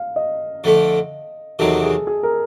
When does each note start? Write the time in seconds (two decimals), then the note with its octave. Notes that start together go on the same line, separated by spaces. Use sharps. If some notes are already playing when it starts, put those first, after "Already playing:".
Already playing: F5
0.16 D#5
0.64 F2 D3 F3 A3
1.59 E2 C3 D#3 F#3 A4
1.83 G#4
2.07 G#4
2.23 A#4